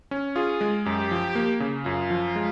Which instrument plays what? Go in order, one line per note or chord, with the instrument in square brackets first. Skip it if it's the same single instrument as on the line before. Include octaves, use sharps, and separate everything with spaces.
[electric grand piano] C#4
[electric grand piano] F4 [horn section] G#4
[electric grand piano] G#3
[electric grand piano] F#2 [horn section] G4
[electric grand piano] F3
A#3
C#3
[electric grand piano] F#2 [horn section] F4
[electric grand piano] F3
G#3